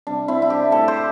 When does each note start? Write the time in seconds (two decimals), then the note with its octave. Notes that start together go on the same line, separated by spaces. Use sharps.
0.07 C3 G3 D4
0.28 C4 E4
0.42 E4
0.50 D4 G4
0.71 A2 A3 E4 A4
0.88 G4 C5